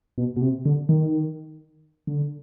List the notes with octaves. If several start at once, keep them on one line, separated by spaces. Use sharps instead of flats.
B2
B2
C3
D3
D#3
D3